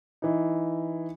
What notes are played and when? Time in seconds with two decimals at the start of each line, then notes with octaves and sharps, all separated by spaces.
0.22 E3 D#4